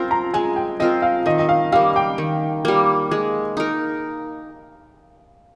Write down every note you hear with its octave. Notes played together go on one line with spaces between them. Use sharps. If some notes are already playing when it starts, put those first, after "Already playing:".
Already playing: C4 F4 A#4 C6
A#5
G#3 G#5
G5
C4 F4 A#4 D#5
F5
D#3 D#5
D#5
F5
G3 A#3 F5
G5
D#3
G3 A#3
G#3
D#4 A#4